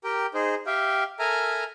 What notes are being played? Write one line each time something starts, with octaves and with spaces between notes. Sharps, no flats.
G4 A#4 G5
D#4 G#4 C5
G4 E5 F5 G5
A4 A#4 E5 G#5 A#5 F6